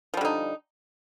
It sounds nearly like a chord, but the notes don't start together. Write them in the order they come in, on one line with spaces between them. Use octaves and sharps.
F3 G3 D3 D#4